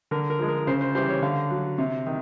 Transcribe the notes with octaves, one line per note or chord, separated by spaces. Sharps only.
D3 A#4
A#4
F3 G#3
A#4
C#3 C5
C5
E3 G3 C5
C#5
D3 F5
F#3
C3
D#3